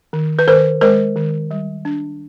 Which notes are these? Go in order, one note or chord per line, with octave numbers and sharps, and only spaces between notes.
D#3
B4
D#3 A#4 C5
G#3 A#4 C5
D#3
G3
D4